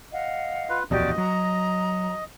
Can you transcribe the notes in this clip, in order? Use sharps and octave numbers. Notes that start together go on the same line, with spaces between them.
D#5 F5 F#5
F4 B4
D1 A#1 E2 F#4 G4 D5 D#5
F#3 A#5